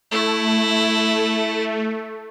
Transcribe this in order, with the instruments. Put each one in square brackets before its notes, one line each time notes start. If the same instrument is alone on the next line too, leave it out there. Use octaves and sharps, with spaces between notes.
[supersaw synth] A3 [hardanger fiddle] E4